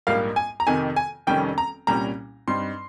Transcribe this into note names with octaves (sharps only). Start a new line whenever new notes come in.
A#1 G#2 G3 A#3 F5
G#5
A#5
F2 C3 D#3 G#5
G#5
F1 F2 D#3 G3 C#4 G5
A#5
C2 A#2 G3 C#4 A#5
G2 G3 C4 D#4 C6